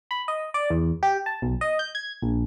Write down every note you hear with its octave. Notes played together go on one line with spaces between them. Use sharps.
B5
D#5
D5
E2
G4
A5
B1
D#5
G6
G#6
A#1